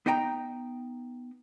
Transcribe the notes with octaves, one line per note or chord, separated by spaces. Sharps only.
B3 D#4 D#5 G5 A#5